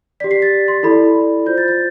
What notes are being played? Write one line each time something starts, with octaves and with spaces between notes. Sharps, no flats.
G4 D5 B6
C7
A6
C6
E4 A4 D5 B5
F4 C5 G6
A6
A6